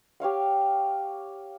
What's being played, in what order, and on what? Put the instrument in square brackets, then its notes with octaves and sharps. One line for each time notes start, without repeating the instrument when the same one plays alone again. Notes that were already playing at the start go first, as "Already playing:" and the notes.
[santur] G4 C#5 F5 F#5